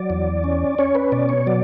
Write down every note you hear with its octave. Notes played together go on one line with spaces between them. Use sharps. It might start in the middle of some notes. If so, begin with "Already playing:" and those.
Already playing: F#3 D5
E2
C#4
C#4 C#5
B4
B2 D5
C#5
F#3 D5